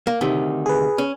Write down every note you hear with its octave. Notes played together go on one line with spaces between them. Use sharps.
A#3
D2 C3 D#3
G#4 B4
C#4